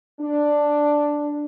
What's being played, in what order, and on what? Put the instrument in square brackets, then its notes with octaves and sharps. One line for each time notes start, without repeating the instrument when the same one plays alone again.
[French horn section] D4